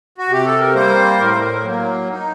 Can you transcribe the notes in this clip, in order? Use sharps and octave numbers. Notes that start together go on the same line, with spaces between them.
F#4
C3 G4
A4
A#4
G3 A#3 C5
A2 A#4
C5
A#4
F#3 A#3
D#4